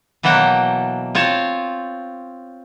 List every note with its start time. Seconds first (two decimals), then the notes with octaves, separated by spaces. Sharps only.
0.23 B2 E3 F#3 A#3 F#5 G5
1.15 C4 F4 C#5 A5